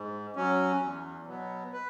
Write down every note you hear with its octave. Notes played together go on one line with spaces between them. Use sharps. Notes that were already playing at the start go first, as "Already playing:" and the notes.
Already playing: G#2
F#3 C#4
E2
B2 F#3 B3
B4